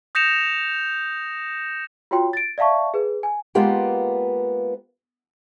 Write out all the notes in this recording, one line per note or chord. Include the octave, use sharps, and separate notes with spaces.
D#6 G6 A#6 C#7 E7 F7
F4 F#4 C#5 G5 C6
A6 D7
D5 E5 F5 A5 C#6
G#4 B4
G#5
G#3 A#3 B3 F4 G4